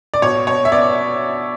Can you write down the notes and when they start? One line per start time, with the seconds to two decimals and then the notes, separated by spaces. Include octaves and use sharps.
0.14 D5
0.22 B2 C#5
0.47 B2 C#5
0.65 E5
0.72 B3 D5